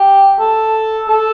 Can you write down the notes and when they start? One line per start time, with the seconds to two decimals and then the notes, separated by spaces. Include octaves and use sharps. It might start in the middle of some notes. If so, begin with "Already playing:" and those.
Already playing: G4
0.39 A4
1.09 A4